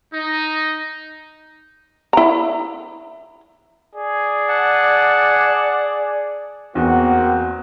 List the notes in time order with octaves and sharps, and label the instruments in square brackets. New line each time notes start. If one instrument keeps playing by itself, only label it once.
[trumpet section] D#4
[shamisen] E4 A#5
[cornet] G#4 [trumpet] D5
[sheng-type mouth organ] F#5 A5
[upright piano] E2 [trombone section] A#3 C4 [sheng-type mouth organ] F#4